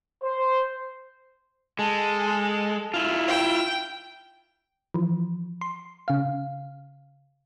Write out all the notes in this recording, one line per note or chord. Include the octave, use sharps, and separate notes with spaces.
C5
G#3 A4
E4 F4
G5
E3 F3
C6
C#3 F5